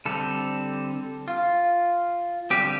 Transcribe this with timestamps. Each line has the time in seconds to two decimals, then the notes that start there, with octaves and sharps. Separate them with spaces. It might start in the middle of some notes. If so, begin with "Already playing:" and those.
0.05 D3 G3 C4 A4
1.28 F4
2.50 D3 G3 C4 G4